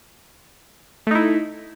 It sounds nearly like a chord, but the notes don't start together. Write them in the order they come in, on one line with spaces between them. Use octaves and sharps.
A3 D#4 E4